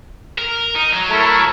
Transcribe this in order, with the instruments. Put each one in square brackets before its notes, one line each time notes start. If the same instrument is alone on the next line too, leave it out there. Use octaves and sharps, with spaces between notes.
[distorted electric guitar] A#4
D#4
F#3
[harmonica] A3 E4 A#4